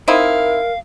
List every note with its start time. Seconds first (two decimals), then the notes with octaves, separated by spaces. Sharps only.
0.08 C4 D#4 E4 A#4 F5